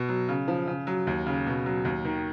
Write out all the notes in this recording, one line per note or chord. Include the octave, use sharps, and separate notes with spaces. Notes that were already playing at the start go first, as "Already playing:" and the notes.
Already playing: B2
F#3
C#3
F3
C#3
F#3
D#2
C#3
B2
F#3
D#2
D#3